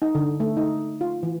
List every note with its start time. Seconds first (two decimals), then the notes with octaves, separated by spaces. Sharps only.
0.02 D#4
0.15 D3
0.40 A3
0.57 D#4
1.01 F4
1.23 E3